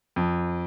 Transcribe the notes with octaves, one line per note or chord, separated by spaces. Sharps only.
F2